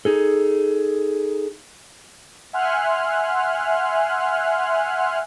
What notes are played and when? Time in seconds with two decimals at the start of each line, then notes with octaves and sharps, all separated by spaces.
0.05 D#4 G#4 A4
2.53 E5 F#5 G#5 C6 F6 F#6